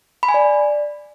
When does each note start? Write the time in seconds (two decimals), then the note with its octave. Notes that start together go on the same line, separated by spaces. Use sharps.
0.23 B5
0.29 G#5
0.34 D5